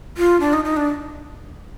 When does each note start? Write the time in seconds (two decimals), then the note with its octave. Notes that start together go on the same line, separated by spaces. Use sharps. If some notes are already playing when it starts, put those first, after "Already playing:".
0.17 F4
0.40 D4
0.53 D#4
0.65 D#4
0.77 D4